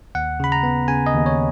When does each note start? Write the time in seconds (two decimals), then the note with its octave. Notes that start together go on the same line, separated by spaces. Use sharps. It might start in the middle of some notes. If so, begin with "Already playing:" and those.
0.15 D#2 F#5
0.40 C#3 B5
0.52 A#5
0.63 B3
0.88 C#3 G#5
1.07 D#5
1.14 D#2
1.26 C#5